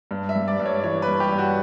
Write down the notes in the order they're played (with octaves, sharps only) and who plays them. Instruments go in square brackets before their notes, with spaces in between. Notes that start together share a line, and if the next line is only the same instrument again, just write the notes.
[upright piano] G2
[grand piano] E5
[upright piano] G3
[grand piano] D5
[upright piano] G2
[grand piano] C#5
[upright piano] E3 [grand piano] C#5
[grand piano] B4
[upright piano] G2
[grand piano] G4
[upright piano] G2
[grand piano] F#4